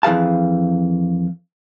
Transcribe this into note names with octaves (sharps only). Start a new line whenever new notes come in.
F2 E3 G#4 F5 A5